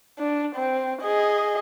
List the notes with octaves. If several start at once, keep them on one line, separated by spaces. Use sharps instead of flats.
D4
C4
G#4 D#5